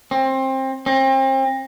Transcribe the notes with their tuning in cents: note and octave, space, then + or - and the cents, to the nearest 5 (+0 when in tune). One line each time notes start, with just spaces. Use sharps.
C4 +25
C4 +35